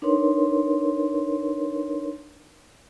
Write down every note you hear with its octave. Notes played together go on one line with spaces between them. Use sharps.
D4 D#4 A#4 B4 C#5 C6